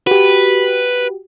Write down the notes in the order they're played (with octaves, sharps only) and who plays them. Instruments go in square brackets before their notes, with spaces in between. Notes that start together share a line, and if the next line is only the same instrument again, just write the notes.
[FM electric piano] F#4 G4 [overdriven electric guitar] B4